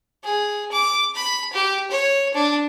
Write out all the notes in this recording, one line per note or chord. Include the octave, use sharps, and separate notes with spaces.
G#4
D6
B5
G4
C#5
D4